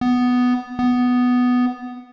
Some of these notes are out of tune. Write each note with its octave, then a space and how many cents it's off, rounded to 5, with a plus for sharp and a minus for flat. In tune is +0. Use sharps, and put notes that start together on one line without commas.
B3 +5
B3 +5